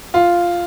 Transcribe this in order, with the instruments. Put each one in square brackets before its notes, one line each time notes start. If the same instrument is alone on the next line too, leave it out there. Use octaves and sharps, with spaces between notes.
[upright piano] F4